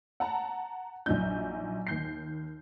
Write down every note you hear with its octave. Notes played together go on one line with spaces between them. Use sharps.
F#5 A5 A#5
A#1 F#3 D#4 G6
D#2 G6 C7